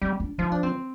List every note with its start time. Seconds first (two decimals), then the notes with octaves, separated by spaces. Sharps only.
0.02 G3 C4
0.20 D4
0.38 F3 D#4
0.52 D4
0.63 C4